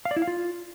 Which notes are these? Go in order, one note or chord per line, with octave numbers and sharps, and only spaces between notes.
F5
D5
E4
F5
F4